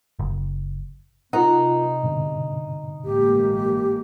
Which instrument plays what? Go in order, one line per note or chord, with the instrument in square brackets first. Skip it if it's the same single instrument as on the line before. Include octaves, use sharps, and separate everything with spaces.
[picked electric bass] F#1
[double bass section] C3 [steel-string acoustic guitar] D#4 [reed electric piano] F4 A#4 F#5
[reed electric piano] G2 B2 D3
[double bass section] A1 G#3 A#3 [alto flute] G4